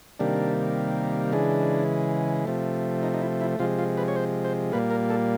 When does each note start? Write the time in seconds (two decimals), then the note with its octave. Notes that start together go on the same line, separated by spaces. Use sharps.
0.19 C3 D#3 G3 A#3 D4
1.32 C#3 E3 G#3 D4
2.46 C3 F3 A3
3.03 D#4
3.14 D#4
3.22 E4
3.41 E4
3.59 C3 F3 G#3 F4
3.79 F4
3.97 B4
4.08 C#5
4.16 C5
4.45 C5
4.72 A#2 G3 A#3 B4
4.91 A#4
5.10 A4